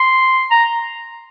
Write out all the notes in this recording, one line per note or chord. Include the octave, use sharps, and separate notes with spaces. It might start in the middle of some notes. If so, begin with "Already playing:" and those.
Already playing: C6
A#5